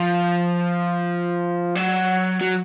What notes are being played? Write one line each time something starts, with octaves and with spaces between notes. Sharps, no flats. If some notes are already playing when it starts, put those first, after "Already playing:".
Already playing: F3
F#3
F#3